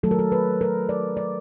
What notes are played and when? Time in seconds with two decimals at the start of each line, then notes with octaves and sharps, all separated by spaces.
0.03 D#3 F#3 A3 A4
0.11 A#4
0.19 A4
0.32 B4
0.61 A#4
0.89 D5
1.17 D5